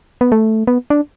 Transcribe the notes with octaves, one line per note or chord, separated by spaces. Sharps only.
B3
A3
B3
D4